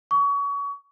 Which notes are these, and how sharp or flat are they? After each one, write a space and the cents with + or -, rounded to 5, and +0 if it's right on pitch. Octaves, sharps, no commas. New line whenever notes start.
C#6 +30